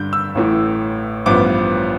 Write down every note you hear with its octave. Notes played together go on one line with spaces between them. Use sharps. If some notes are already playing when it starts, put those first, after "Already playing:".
Already playing: G2 D3 G3 D4 G6
E6
A1 A2 E3
A1 G2 F3 B3 D6